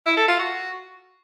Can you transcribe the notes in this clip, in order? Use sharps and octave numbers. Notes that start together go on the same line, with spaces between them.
E4
A4
F4
F#4